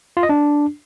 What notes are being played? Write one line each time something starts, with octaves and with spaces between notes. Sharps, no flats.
F4
D#5
D4